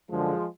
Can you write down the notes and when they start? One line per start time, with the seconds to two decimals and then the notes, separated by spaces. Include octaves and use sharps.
0.10 F#2 D3 F3 G#3